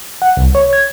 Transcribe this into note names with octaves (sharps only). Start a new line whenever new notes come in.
F#5
C2
C#5
G#6